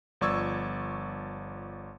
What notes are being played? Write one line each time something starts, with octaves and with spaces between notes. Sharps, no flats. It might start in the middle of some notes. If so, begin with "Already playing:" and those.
G1 F3 D5 C#6 E6 G#6